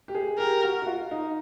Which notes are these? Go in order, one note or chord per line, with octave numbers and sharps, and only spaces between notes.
G4
G#4
G4 A#4
F#4
F#4
F4
D#4